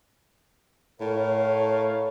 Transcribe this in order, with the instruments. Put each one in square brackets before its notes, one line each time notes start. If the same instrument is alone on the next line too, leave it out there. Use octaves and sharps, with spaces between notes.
[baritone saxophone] A2 [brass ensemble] A#4 C#5 F5